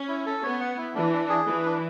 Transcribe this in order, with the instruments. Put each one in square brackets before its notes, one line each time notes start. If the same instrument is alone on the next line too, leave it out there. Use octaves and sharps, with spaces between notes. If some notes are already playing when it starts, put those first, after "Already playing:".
Already playing: [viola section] C#4
[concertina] E4
A4
[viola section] B3 [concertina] C#5
[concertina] F#5
E4
[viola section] E3 [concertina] D4
[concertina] D4
G#4
[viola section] E3 [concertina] B4
[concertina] D4